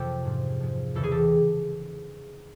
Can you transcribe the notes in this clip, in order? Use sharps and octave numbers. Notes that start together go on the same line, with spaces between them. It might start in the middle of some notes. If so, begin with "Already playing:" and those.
Already playing: F2 C3 F3 G4 A4
G#2 F3
G#2 F3
E2 C#3 E3 A4
G#4
G4 A4